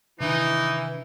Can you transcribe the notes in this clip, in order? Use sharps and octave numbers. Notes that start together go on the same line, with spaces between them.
C3 D#3 E3 D4 D#4